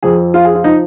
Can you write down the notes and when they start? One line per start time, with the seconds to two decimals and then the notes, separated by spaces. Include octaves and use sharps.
0.03 F2 F3 G#4
0.34 F4
0.45 G#4
0.54 F4
0.64 F3 D#4